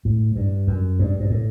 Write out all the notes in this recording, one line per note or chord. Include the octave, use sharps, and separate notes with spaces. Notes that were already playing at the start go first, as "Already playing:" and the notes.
A2
G2
F#2
G2
G2
A2